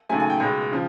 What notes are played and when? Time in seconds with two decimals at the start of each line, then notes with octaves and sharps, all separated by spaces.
0.09 D#2 C#3 F#3 A3 G#5
0.20 G#5
0.30 G5
0.40 C#2 B2 G#3
0.72 C#3 F3